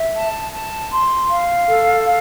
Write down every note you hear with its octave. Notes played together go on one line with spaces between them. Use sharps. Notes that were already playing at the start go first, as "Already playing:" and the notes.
Already playing: E5
A5
A5
C6
F5
A4
F5